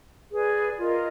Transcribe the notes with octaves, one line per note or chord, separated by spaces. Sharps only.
G#4 B4 D5
F4 A#4 D#5